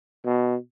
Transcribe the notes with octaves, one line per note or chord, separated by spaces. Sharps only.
B2